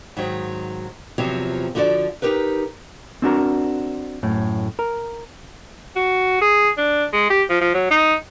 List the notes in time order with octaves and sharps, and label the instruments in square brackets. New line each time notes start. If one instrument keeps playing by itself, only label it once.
[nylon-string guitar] G#2 D#3 F#3
E2 C3 F3 F#3
D3 F3 F#4 A4 D5
D#4 G4 A#4 B4
[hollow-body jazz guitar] C4 D4 F#4 A#4
F#2 A2
A#4
[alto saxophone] F#4
G#4
D4
G#3
G4
F3
F3
F#3
D#4